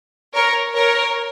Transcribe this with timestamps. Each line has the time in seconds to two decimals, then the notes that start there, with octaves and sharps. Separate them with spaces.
0.34 A#4 C#5
0.75 A#4 C#5